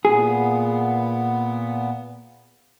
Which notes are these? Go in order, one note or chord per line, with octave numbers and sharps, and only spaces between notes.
A#2 B3 G#4